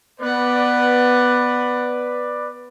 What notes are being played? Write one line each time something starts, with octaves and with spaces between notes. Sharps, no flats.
B3 B4 D5 F#5